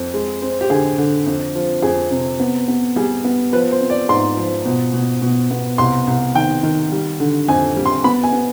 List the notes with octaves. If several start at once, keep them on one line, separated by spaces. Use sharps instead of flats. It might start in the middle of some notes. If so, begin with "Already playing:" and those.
Already playing: F2
G#3
C4
G4
D3 G#4
D3
F2
F3
F2 G#4
C3
B3
B3
G3 G#4
B3
F3 B4
C5
C4
D5
G#2 C6
F3
B2
B2
B2
B3
C2 C6
C2
D#3 G5
D#3
G3
D3
F2 G#5
G3
C6
B3 B5
G#5
B3